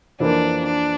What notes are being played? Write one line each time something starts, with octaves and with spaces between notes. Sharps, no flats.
F2 E3 A#3 D4
D4